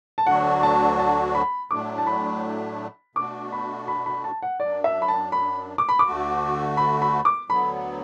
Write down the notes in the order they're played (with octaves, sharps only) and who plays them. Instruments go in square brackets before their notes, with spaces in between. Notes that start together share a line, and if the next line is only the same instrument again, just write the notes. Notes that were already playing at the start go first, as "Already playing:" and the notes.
[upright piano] A5
[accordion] D2 D3 F#3 D4 F#4 [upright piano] F#5
[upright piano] A5
A5
B5
[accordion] A2 F#3 A3 D4 [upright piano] D6
[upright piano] A5
B5
[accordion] B2 A3 D4 F#4 [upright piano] D6
[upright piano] B5
B5
B5
A5
F#5
[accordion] F#2 F#3 D4 [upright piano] D5
[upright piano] E5
B5
A5
B5
D6
B5
D6
[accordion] D2 D3 A3 F#4
[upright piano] B5
B5
D6
[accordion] D2 D3 F#3 B3 [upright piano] B5